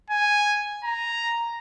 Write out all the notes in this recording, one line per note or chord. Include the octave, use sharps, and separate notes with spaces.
G#5
A#5